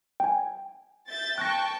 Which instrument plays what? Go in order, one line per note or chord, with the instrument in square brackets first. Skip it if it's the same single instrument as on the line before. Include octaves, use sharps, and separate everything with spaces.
[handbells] G5 G#5
[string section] E5 G6 A6
[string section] G5 A5 C#6 [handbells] F#6 A#6